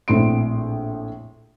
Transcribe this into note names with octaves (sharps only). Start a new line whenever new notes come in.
A#1 A2 C4 C6 D7